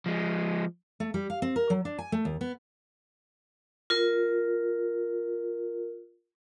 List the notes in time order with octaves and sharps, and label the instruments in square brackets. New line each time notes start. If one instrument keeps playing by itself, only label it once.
[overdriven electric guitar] F3 G#3
[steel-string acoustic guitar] A3
G3
F5
C4
A#4
F#3
D4
G#5
A3
D#2
B3
[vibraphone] F4 A#4